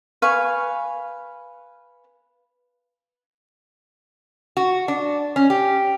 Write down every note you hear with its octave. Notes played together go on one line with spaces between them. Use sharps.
B4 F5 G#5 C#6
F#4
D4
C#4
G4